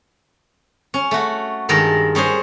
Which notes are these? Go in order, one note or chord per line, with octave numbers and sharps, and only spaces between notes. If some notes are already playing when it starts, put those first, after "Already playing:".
C#4
A3 F#4
G2 D#3 G#3 A4 A#4
G3 C#4 G#4 C5